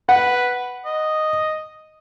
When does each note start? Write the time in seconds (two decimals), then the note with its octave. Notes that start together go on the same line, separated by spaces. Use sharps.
0.09 B4 F#5
0.86 D#5